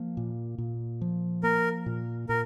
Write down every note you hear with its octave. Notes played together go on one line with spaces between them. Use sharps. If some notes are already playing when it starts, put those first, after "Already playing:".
Already playing: F3 A#3
A#2
A#2
F3
A#3 A#4
A#2
A#2 A#4